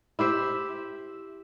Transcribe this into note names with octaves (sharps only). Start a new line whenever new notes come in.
E4 G4 C5 E5